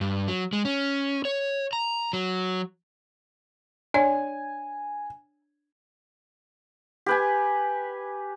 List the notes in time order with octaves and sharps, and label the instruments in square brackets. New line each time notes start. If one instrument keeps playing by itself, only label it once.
[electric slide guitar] G2
F#3
G#3
C#4
C#5
A#5
F#3
[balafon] D4 C#5 D5 [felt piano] G#5
[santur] G4 B4 G#5